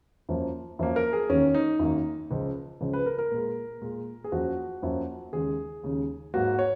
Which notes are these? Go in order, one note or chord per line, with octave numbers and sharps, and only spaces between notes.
F#2 F3 A#3
F#2 F3 A#3
A#4
G#4
F#2 D#3 A#3 C#4
D#4
F#2 D#3 A#3
C#2 C#3 F3
C#2 C#3 F3
B4
A#4
A#4
A#2 G#3
A#2 G#3
G#4
F#2 F3 A#3 F#4
F#2 F3 A#3
D#2 C#3 G#3 G#4
D#2 C#3 G#3
G#2 F#3 A#3 F#4
C#5